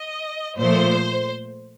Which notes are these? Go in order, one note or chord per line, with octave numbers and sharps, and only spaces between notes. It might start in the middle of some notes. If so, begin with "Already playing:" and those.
Already playing: D#5
A#2 F3 A3 C5